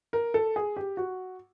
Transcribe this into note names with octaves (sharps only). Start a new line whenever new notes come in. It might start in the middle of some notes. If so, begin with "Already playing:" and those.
A#4
A4
G#4
G4
F#4